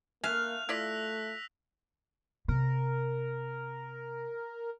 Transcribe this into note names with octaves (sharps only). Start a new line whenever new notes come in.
A3 A#3 E5 F5 G#5 F#6 F7
A3 E4 F4 D5 E6 A#6 B6
C3 A#4